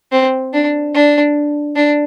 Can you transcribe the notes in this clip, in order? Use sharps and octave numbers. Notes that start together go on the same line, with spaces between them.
C4
D4
D4
D4